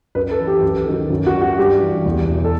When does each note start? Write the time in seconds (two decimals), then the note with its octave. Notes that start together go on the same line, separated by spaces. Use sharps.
0.15 F#2 B4
0.31 A4
0.39 E3
0.47 G4
0.62 F#2
0.87 D#3 F#3
1.10 F#2
1.26 F#4
1.33 F#3
1.42 F#4
1.58 G2 G4
1.82 E3
2.06 E2
2.29 B2 F#3
2.44 A4